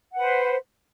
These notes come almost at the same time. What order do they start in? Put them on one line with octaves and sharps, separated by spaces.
F#5 B4 C5